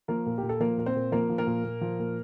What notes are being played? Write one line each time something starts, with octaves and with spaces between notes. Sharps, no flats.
F3 A#3 A#4
A#2
G4
A#2
A4
F3 A#3 A#4
A#2 A#4
C4 C5
A#2
F3 A#3 A#4
F3
A#3 A#4
A#2
A#2
F3
A#2